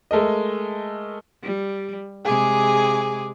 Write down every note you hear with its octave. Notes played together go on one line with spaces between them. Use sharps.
G#3 A3 A#4 D#5
G3
C3 G#3 G#4 G#5 D6